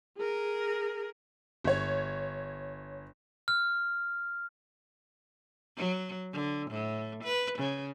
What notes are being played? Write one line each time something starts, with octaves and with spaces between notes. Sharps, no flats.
G#4 A#4
G1 C#5
F6
F#3
D3
A2
B4
C#3